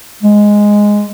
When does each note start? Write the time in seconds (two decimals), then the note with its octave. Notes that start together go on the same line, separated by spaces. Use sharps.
0.23 G#3